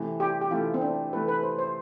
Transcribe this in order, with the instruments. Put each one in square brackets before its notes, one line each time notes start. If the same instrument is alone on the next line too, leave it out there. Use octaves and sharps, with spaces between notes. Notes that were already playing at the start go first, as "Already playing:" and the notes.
Already playing: [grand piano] C3 E3 A3
[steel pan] G4
G4
[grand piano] C3 E3 A3 [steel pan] F4
[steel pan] C4
D4
[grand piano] C3 E3 A3 [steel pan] B4
[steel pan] B4
C5
C5